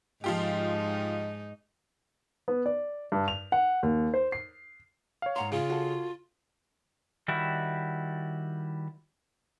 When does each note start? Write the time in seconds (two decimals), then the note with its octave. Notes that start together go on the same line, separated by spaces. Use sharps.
0.24 G#2 F3 D#4 F4 G4
2.48 B3
2.66 D5
3.12 G2
3.28 F7
3.52 F#5
3.83 D#2
4.14 C5
4.32 C7
5.22 C#5 F5
5.36 G#2 F#5 A#5 C6
5.52 C#3 F4
5.70 F#4 A4
7.28 D#3 G3 E4 F#4